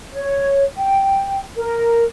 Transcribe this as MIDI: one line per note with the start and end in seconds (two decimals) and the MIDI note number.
0.13 0.64 73
0.78 1.42 79
1.57 2.03 70